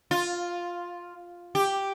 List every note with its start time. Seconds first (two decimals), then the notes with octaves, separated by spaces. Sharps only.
0.11 F4
1.55 G4